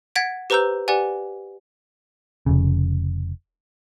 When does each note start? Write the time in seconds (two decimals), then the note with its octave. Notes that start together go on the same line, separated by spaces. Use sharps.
0.16 F#5 G#6 A6 B6 D7
0.50 G4 B4 C5 A#5 E6 G6
0.88 G4 B4 D5 F#5 G#5
2.46 F1 C#3